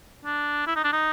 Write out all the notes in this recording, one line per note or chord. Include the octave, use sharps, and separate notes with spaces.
D4
E4
D#4
D4
D#4